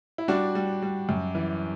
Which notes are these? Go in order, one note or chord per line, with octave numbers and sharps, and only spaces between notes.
E4
G3 D4 F#4
G3
G3
F#2
E3